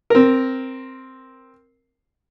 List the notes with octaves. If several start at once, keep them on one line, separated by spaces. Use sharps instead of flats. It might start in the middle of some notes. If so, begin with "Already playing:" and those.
C4 A#4